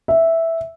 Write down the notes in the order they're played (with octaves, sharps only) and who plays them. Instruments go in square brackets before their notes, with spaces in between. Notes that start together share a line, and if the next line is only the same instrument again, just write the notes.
[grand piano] E5